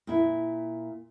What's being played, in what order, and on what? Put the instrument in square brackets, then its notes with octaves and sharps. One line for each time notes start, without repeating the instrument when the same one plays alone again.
[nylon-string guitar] A#2 E4